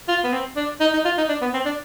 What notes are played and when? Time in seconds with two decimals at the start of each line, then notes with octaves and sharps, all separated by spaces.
0.08 F4
0.24 B3
0.33 C4
0.57 D4
0.81 D#4
0.93 D#4
1.05 F4
1.18 D#4
1.29 D4
1.42 B3
1.54 C4
1.66 D4